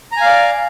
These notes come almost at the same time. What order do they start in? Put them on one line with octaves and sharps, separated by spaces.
A#5 G#5 F5 D5